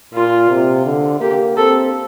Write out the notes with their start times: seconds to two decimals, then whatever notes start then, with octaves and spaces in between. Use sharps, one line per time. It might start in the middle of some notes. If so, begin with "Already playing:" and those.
0.14 A#2 F4
0.49 C3
0.85 D3
1.20 A#3 G4
1.57 C4 A4